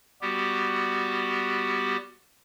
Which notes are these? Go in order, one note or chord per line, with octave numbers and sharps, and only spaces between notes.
G3 B3 F#4 G4